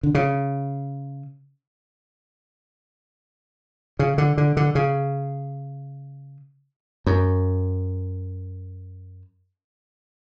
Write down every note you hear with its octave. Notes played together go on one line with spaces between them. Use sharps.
D3
C#3
C#3
D3
D3
D3
C#3
F#2